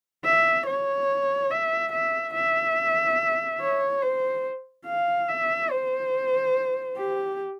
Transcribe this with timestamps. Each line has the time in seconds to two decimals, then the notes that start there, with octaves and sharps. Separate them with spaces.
0.25 E5
0.67 C#5
1.51 E5
1.92 E5
2.34 E5
3.61 C#5
4.03 C5
4.86 F5
5.29 E5
5.71 C5
6.97 G4